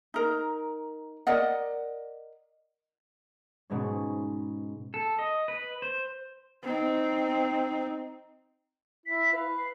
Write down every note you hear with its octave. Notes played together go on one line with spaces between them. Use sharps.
D#4 A#4
A#4 D5 D#5 F#5
G#2 B2 G#3 C#4
A4
D#5
B4
C5
C4 D#4
E4 B6
B4 F5
C7